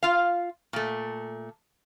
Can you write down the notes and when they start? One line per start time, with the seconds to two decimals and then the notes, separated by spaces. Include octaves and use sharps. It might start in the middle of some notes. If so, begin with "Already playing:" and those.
0.03 F4 F5
0.73 A#2 A3